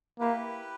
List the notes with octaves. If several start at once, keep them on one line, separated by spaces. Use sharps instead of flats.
A#3 E4 G4 B4